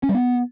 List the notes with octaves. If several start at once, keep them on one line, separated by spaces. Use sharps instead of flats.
C#4
G3
B3